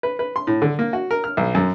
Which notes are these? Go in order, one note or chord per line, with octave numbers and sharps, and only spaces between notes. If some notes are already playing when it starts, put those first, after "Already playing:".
B4
B4
C6
A2
D3
A#3
F#4
A#4
F6
B1
F#2